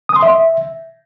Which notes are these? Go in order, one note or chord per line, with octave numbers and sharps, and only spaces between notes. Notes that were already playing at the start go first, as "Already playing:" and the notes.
D#6
C6
E5